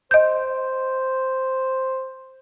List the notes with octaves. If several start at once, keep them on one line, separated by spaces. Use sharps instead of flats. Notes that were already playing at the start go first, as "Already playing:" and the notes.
C5 D#5 G6